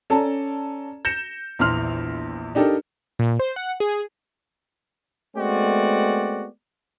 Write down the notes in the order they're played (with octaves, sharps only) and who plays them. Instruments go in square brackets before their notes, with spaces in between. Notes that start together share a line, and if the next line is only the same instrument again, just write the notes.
[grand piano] C#4 A4 D5 A5 A#5
G6 A#6 C#7 E7
A#1 E2 C6 F6 F7
D4 D#4 G4 A4 A#4
[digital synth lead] A#2
C5
F#5
G#4
[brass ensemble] G#3 A3 B3 C4 F#4 D5